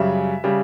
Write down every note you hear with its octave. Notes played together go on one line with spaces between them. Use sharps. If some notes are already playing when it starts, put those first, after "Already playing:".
Already playing: F#2 C#3 G3 E5
C#3 G3